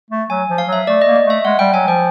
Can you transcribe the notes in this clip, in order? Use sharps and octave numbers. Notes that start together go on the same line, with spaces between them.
A3
F#3 G#5
F3
F5
F#3
E5
A3 D5
A#3 D#5
D#5
A3 E5
G#3 F#5
G3 G5
F#3 G#5
F3 G5